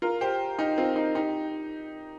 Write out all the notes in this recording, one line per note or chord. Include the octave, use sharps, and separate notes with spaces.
F4 A#4
G4 C5
D#4 G4
C4 F4
D#4
D#4 G4